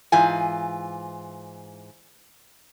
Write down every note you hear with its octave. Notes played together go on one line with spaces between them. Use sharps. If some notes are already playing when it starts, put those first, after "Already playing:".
G#2 E3 F4 G#5